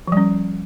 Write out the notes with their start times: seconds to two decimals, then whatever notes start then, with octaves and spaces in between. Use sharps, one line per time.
0.08 F3
0.12 G3
0.17 C#4